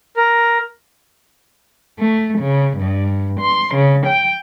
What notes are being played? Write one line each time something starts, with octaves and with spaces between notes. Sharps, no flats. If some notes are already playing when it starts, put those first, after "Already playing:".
A#4
A3
C#3
G2
C6
C#3
G5